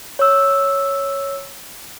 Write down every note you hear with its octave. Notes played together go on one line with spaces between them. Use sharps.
C#5 E6